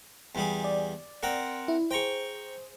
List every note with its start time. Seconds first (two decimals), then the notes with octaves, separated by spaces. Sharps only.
0.35 E2 G3 G#4
0.64 D5
1.23 C4 A#4 F#5
1.68 E4
1.91 G#4 C5 G5 A#5 C#6